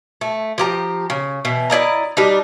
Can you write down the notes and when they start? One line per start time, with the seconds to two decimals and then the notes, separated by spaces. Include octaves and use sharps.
0.21 A3
0.58 F3 G4 A#5
1.10 C#3
1.45 B2 E3
1.70 E4 D5 D#5 A#5
2.17 G3 D4 D#4